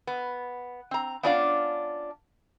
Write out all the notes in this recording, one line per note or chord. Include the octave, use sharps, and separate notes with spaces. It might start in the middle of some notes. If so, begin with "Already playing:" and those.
B3
C4 A#5
B3 C#4 D4 F4 D5 F5